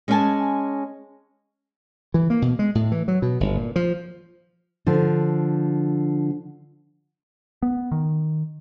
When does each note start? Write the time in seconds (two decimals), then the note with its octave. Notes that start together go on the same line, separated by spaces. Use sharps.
0.08 G#3 C#4 D#5 E5 G#5 A5
2.14 E3
2.30 A#3
2.42 B2
2.59 G#3
2.75 A2
2.92 E3
3.08 F#3
3.22 B2
3.40 G1
3.56 A#2
3.76 F3
4.86 D3 F3
7.63 B3
7.92 D#3